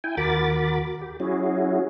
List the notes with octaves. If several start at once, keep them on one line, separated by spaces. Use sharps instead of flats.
E4 G5 G#5
D#2 F#4 A#4 B5 D6 A6
G4
F#3 C#4 E4 F#4 G#4